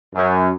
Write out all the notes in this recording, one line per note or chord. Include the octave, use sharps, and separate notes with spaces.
F#2